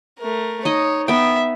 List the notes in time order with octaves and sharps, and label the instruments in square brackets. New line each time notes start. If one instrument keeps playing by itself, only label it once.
[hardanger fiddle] A3 A#4
[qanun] D#4 D#5 [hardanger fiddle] C#5
[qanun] B3 G5 [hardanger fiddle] E5